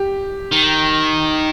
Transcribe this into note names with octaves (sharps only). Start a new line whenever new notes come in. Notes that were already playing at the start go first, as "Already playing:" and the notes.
Already playing: G4
D#3